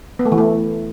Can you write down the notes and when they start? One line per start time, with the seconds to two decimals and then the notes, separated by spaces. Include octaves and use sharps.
0.19 B3
0.26 A3
0.32 E3
0.38 A3